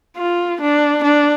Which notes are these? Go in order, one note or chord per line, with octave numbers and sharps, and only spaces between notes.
F4
D4
D4